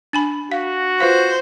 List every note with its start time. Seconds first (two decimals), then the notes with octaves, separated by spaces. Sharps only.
0.13 D4 G#5 B5
0.52 F#4 F5
1.00 F4 B4 C5 F5